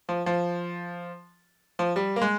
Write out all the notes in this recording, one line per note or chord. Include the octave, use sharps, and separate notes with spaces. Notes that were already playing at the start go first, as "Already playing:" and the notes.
F3
F3
F3
G3
A#3
G#3